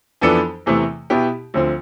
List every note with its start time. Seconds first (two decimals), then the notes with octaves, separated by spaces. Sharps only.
0.22 F2 E3 B3 D4 A4
0.66 E2 C3 E3 A3
1.10 B2 B3 E4 G4
1.54 D2 D3 F3 C4